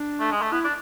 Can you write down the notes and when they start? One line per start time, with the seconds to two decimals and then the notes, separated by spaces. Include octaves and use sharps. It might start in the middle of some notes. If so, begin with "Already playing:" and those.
Already playing: D4
0.20 A3
0.31 G#3
0.42 A3
0.51 B3 E4
0.64 D4